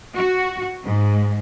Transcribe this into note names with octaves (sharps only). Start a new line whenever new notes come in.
F#4
G#2